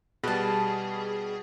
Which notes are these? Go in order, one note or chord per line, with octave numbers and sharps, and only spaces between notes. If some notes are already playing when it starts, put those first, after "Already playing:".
B2 G3 G#4 B4 A5